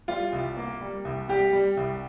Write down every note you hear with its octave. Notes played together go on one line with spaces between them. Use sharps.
G3 F4
C2
A#3
G3
C2
G3 G4
G3
C2